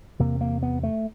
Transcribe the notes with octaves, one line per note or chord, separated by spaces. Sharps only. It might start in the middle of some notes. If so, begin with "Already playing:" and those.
E2 C3 A#3
A#3
B3
A3